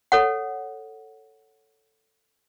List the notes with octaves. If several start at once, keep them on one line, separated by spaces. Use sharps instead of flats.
A4 C#5 F#5